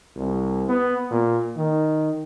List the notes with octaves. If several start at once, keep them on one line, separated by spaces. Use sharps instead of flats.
C2
B3
A#2
D#3